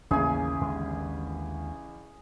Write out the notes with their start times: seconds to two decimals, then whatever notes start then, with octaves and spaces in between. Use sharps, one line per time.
0.11 A1 D#2 C#3 G#3 A#3 G#4 G#5
0.62 D#2 D3 G#3